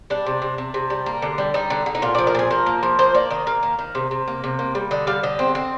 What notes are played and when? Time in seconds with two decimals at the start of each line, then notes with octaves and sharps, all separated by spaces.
0.10 G3 D4
0.26 C3
0.42 C3
0.58 C3
0.74 C3
0.90 G3
1.06 A#3
1.22 D3
1.38 G3
1.54 G3 D#4
1.70 D3
1.86 D3
1.95 D#4
2.02 A#2 F4
2.15 F3 D5
2.27 A#4
2.35 A#2 G#4
2.51 F3 A#4
2.66 A#3
2.83 F3
2.99 A#3 C5
3.14 A#3 D5
3.30 D#3 D#5
3.47 A#3 F5
3.63 D#3
3.79 D#3
3.95 C3
4.11 C3
4.28 A#3
4.44 C3
4.59 A#3
4.75 G3
4.91 D3 D#5
5.07 G3 F5
5.23 D3 D#5
5.39 C4
5.55 C4